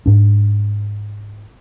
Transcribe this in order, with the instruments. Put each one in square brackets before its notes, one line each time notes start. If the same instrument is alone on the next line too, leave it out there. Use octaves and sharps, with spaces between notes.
[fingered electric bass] G#2 D4